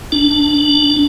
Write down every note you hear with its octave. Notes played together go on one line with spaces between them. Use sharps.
D4